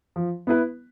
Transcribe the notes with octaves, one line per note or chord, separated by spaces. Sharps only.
F3
B3 E4 B4